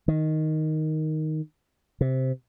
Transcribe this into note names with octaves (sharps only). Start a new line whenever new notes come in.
D#3
C3